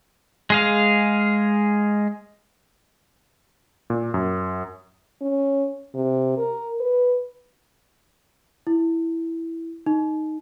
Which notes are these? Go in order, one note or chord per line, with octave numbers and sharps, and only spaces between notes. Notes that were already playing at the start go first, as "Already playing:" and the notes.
G#3 G#4 F5
A#2
F#2
C#4
C3
A#4
B4
E4
D#4